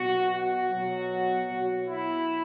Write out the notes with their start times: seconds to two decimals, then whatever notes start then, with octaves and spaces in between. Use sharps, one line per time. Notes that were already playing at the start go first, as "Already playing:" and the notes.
Already playing: B2 F#3 F#4
0.31 F#4
0.71 B2 F#3
1.47 B2 F#3
1.85 E4